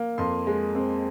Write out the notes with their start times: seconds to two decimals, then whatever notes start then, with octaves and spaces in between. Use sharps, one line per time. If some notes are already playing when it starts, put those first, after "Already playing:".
Already playing: A#3
0.18 F2 C6
0.47 G#3
0.75 C4